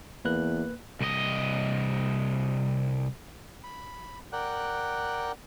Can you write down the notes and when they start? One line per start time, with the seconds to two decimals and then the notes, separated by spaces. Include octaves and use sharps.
0.25 E2 A#3 B4 F#6
1.00 C2 D#5
3.64 B5
4.33 A#4 D5 F#5 G5 F#6